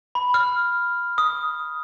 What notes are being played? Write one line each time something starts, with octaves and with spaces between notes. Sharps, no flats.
B5
F6
D#6